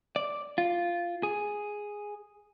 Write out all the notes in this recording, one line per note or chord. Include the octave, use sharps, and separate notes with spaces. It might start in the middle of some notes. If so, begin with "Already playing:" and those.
D5
F4
G#4